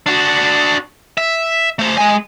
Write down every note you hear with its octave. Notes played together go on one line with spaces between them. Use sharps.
D4 F#4
E5
A3 C5
G#3 G#5